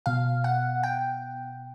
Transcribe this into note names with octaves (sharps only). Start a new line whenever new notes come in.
B2 F5
F#5
G5